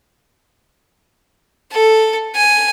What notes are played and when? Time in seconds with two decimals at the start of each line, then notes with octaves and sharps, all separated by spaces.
1.72 A4
2.35 G#5